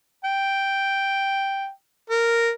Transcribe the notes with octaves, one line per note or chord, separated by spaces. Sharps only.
G5
A#4